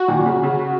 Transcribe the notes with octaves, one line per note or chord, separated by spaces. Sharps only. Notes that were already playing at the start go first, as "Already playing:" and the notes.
Already playing: F#4
A#2 D#3
A#2
C#3
C#3